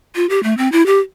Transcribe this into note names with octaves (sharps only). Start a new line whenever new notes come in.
F4
G4
A3
C4
E4
G4